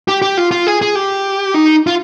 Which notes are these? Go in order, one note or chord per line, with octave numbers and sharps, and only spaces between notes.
G4
G4
F4
F4
G#4
G#4
G4
D#4
F4